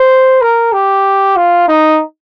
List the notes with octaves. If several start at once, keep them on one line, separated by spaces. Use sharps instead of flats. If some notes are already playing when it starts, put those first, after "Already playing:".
Already playing: C5
A#4
G4
F4
D#4